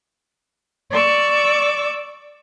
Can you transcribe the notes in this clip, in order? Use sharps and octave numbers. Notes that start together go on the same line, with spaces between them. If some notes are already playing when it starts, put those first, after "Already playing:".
D5 C#6 D6 E6